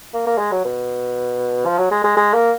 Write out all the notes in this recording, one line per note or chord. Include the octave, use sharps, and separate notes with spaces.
A#3
A#3
G#3
F#3
B2
F3
F#3
G#3
G#3
G#3
A#3